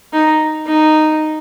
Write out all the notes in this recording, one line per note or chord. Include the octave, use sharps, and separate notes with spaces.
D#4
D#4